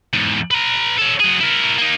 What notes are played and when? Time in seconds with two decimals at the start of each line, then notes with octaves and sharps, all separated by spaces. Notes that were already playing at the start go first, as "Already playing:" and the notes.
0.13 E2 G#2
0.51 B4 A#5
0.98 C#4 A4
1.20 F#3 G#4
1.40 E4 A#4
1.78 A#3 D#4